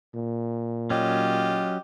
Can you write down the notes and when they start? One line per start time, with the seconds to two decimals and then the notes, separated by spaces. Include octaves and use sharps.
0.15 A#2
0.90 F#3 C#4 F4 G4 D#5